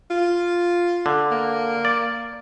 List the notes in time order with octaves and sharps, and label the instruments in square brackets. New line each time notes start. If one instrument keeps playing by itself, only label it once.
[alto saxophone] F4
[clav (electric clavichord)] D3
[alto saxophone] A#3
[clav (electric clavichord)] D5